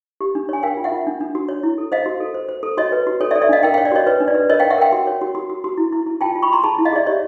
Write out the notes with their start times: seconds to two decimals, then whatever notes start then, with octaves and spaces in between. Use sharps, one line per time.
0.21 G4
0.35 D4
0.49 C#5 G#5
0.63 A#4 F5 G5
0.77 F4
0.84 E5 F#5
0.92 F4
1.07 D4
1.21 D4
1.35 F#4
1.49 C#5
1.63 E4
1.78 A4
1.92 C5 D#5 F5
2.06 F#4
2.20 A4
2.34 C5
2.49 C5
2.63 A4
2.77 F#4 C#5 D#5
2.92 B4
3.07 F#4
3.21 A4 C#5
3.31 D5 E5
3.36 A4
3.42 D5 E5
3.49 D4 D#5 F5
3.63 A#4 F5 G5
3.74 F5 G5
3.78 C#5
3.85 D5
3.92 F#4 C#5 D#5
4.06 B4 C#5
4.20 D4
4.28 D5
4.35 B4
4.50 A#4 C#5 D#5
4.60 F5 G5
4.63 C#5
4.70 E5 F#5
4.78 A#4 F5 G5
4.92 F#4
5.07 C#5
5.22 F#4
5.35 F#4
5.50 F#4
5.64 F#4
5.78 E4
5.92 E4
6.07 E4
6.21 F4 G5 A5
6.35 F4
6.43 B5 C#6
6.50 F4 A#5 C6
6.63 G#4 A5 B5
6.78 E4
6.85 D#5 F5
6.93 G#4 D5 E5
7.06 G4 C#5 D#5